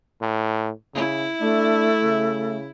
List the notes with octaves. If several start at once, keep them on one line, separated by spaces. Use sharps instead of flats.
A2
C#3 E4
A3 D4
C#3